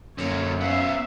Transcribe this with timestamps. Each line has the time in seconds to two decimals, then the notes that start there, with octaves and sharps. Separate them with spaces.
0.18 F#2 D3 A#3 C#5
0.61 B3 C#4 E5 F5